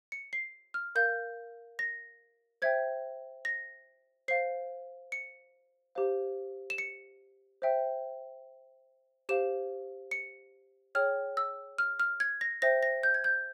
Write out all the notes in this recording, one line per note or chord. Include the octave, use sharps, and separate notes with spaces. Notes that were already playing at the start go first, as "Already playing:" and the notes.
C#7
C7
F6
A#4 F5 G6
A#6
C5 E5 G5 G#6
A#6
C5 F5 C7
C#7
G4 C5 F5
E7
C#7
C5 E5 G5
G4 C5 F5 E7
C#7
G#4 C#5 G5 F6
E6
F6
F6
G#6
A#6
C5 E5 G5 A#6
A#6
G6
G#6
G6